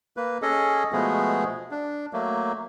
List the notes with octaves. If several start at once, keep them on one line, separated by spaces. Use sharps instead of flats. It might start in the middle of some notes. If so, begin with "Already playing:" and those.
A#3 B4
C#4 G#4 A4 D#5
B2 F3 G#3 A3 B3 G#4
D4
F#3 A3 A#3